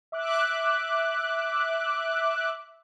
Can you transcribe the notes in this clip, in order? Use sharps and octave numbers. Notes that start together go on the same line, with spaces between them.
E5 D6 F#6